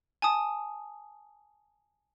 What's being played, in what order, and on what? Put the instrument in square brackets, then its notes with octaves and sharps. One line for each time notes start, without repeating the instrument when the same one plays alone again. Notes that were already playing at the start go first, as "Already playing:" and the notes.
[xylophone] G#5 A5 D#6